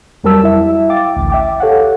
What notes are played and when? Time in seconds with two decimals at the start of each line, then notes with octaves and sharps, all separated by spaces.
0.24 F2 F#3 G3 A#4 A5 E6
0.43 E4 E5
0.89 F5 G5 D6 A6
1.16 A1 D2
1.30 E5 G5 D6
1.60 G4 A4 C#5 F5 F#5